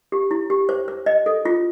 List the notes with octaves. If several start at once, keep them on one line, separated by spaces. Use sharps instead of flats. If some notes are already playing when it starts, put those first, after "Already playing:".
G4
E4
G4
C5
C5
D#5
A4
F4